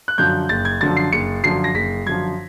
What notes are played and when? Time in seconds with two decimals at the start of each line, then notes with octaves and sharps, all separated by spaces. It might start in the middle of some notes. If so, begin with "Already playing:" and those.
0.08 F#6
0.18 F#2 D3 F3 G6
0.49 F#1 A6
0.65 G#6
0.81 F#2 D3 F3 A6
0.97 C7
1.12 F#1 C#7
1.43 F#2 D3 F3 C7
1.64 A#6
1.74 F#1 B6
2.06 F#2 D3 F3 G#6